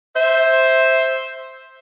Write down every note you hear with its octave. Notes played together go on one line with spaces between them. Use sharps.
C5 E5